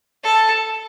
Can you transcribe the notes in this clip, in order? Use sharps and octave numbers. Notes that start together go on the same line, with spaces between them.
A4